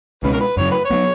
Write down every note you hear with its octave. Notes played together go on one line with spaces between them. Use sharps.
C#2 B2 G#3 C#4 B4
A#4
B4
F#2 C#3 F#3 C#5
B4
C#5
F#3 B3